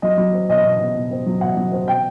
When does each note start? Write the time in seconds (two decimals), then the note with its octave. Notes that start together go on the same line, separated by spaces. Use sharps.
0.02 F#3 D#5
0.18 F#3
0.33 C4
0.49 B2 D#5
0.64 B2
0.80 B2
0.95 B2
1.11 C4
1.26 F#3
1.41 B2 F#5
1.57 F#3
1.72 C4
1.87 B2 G5